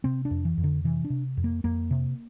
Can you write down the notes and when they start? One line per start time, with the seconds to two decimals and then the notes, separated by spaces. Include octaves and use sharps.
0.04 C3 C4
0.25 D4
0.31 F2
0.45 E3
0.58 F2
0.64 D3
0.84 C3 E3
1.04 D4
1.10 C3
1.37 F2
1.44 A#3
1.64 F2 A#3
1.91 C3